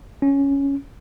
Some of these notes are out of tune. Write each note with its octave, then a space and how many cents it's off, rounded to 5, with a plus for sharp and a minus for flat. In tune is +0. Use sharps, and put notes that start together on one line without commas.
C#4 +5